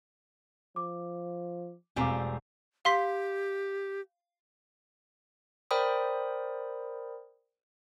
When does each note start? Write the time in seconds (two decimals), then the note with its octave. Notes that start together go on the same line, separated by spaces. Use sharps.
0.76 F3 D6
1.96 E1 G3 A3 C4 F5 G#5 A#5 D6
2.85 G4 F5 C6 B6
5.71 A#4 C5 D5 G5 B5 D#6